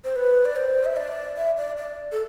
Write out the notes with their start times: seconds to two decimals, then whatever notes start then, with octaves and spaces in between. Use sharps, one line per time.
0.04 C5
0.16 B4
0.45 D5
0.56 C5
0.85 E5
0.97 D5
1.37 E5
1.57 D5
1.77 D5
2.12 A4